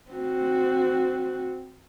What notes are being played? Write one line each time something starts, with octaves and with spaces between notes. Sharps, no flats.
C4 F#4